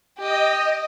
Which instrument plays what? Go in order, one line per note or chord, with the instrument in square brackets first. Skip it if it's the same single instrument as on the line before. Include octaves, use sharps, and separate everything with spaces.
[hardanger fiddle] G4 [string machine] D#5